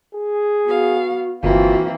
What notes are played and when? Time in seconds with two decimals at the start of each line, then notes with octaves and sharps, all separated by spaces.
0.15 G#4
0.65 B3 F#4 F5
1.43 G1 E3 A#3 C4 F4 F#4